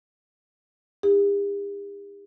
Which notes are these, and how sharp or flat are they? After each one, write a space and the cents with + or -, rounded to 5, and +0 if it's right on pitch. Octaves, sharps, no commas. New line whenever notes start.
D#4 +25 G4 +45